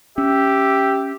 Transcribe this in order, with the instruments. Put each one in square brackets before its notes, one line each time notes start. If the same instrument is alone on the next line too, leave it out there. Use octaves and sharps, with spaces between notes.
[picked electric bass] C#4 [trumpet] G4 [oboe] E5